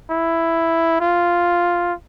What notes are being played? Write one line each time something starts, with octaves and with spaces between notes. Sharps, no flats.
E4
F4